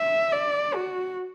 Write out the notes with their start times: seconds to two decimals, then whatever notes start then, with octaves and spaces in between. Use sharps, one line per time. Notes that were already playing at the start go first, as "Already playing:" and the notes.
Already playing: E5
0.33 D5
0.75 F#4